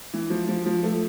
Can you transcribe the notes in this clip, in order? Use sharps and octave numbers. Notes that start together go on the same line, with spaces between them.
E3
F3
F3
F3
A3